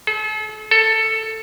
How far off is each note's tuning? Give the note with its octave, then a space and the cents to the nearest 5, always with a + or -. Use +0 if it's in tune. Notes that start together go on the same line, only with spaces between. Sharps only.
A4 -40
A4 +10